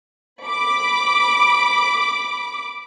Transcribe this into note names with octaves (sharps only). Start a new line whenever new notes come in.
B5 D6